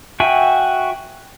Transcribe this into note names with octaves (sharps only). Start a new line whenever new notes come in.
F#4 E5 G5 G#5